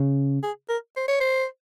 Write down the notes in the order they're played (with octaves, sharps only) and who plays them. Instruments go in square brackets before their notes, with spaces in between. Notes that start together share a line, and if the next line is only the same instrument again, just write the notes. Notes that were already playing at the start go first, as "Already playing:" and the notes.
Already playing: [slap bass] C#3
[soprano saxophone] G#4
A#4
C5
C#5
C5